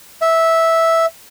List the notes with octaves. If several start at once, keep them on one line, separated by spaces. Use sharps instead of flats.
E5